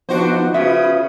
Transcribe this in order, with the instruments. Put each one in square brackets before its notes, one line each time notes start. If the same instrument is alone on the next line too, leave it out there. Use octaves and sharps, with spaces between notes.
[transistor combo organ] F3 B3 D#4 [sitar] D4 F#4 C5
[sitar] C#3 [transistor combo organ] F4 B4 D#6 [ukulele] F#4 E5